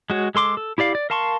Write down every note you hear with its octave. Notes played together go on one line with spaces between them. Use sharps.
G#3 F#4 C#5
G#3 A4 C6 D6
A4
E4 G4 D5 F5
D5
A#4 F5 A5 C6 C#6